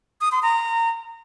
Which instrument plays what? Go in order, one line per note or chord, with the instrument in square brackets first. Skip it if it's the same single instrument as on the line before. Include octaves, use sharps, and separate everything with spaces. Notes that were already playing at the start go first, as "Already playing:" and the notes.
[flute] D#6
C6
A#5